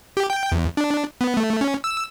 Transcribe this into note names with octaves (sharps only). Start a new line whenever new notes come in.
G4
G5
E2
D4
B3
A3
C#4
E6